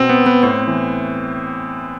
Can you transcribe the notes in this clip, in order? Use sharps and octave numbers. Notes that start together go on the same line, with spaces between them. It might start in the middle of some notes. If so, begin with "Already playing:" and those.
Already playing: B2 C4
B3
B3
A2 C4
E3